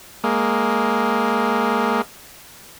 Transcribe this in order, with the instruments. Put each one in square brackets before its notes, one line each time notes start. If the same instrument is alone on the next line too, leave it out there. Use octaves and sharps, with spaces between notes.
[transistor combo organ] G#3 A#3